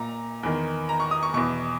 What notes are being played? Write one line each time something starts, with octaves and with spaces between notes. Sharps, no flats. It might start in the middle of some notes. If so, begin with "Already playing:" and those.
Already playing: A#2 A#5
E2 D#3
A#5
C#6
D#6
C#6
E2 B2 C#6